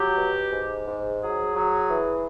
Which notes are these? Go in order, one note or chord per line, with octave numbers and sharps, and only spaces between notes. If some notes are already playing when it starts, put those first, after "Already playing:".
Already playing: F#3 G4
B2
G#2
G#2
F#3 G#4
F#3
E3